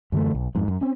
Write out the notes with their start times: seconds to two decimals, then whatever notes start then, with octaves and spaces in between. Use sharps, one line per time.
0.12 F#2 D3 E3 A3
0.35 B1
0.55 F2 G#2
0.68 F#2
0.81 C4 C#4